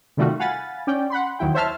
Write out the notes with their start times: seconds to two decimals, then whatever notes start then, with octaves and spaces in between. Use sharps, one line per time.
0.17 C3 D#3 G3 A3 F4 F#4
0.39 F5 F#5 G#5 B5 A6
0.87 C#4 D5 G5
1.10 F#5 B5 C6
1.39 D#2 F#3 E4 G5
1.54 C5 C#5 E5 A5 F6